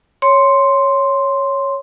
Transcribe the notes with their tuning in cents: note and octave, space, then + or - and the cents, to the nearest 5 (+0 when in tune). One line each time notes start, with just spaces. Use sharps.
C#5 +0 C6 +0